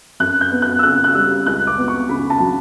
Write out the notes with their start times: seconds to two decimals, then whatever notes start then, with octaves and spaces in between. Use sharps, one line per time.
0.20 F#2 F#6
0.41 G6
0.52 B3
0.62 F#6
0.79 E6
0.83 C#3 F#6
1.04 F#6
1.15 G3 E6
1.46 C#2 F#6
1.67 D6
1.78 B3
1.88 C#6
2.09 C#3 B5
2.30 A5
2.40 F#3